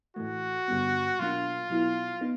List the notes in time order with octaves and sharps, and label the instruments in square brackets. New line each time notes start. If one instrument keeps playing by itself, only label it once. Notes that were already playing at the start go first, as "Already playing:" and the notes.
[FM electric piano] A2 E3 A3 [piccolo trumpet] F#4
[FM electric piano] G2 D3 G3 B3
[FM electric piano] B2 F#3 A#3 D4 [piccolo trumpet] F4
[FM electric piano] B2 F#3 B3 E4
B3 D#4